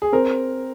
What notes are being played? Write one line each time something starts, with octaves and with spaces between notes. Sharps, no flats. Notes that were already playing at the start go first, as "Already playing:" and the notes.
G#4
C4 A#4